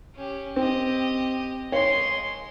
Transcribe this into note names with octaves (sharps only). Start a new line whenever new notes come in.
C#4 G4
C4 G4 D#5
G#3 C#5 C6